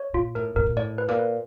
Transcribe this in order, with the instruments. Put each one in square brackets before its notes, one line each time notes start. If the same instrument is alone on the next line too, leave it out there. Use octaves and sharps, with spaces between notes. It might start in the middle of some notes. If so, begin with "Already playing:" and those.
Already playing: [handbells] C#5
[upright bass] A#2 [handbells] F4
[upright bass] A2 [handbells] A#4
[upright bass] A2 [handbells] A#4
[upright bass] A#2
[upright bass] A2 [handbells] D5
[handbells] B4
[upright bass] A#2
[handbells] B4